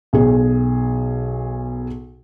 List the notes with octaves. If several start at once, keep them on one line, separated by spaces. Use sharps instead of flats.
B1 G#4